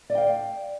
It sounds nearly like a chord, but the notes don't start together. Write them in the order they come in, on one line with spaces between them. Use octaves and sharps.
D5 D#5 G5 F5